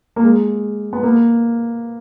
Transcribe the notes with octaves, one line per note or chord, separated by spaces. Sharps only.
A#3
G#3
B3
A#3